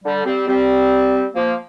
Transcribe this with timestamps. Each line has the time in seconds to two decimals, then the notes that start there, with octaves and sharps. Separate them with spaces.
0.04 D3 G3
0.26 G3 C4
0.48 G3 C4
1.35 F3 A#3